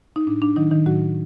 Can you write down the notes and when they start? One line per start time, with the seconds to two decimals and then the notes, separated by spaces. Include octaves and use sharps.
0.16 D#4
0.27 A2 D4
0.42 D4
0.56 D#3 F#3 D#4
0.71 D#3 D#4
0.86 A2 F#3 F#4